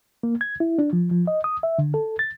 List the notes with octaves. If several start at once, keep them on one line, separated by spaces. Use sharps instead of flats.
A#3
G#6
E4
D4
F3
F3
D#5
D#6
E5
D3
A4
A6